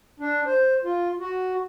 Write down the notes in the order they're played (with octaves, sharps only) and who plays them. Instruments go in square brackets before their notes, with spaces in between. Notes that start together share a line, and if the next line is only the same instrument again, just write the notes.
[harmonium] D4
C5
F4
F#4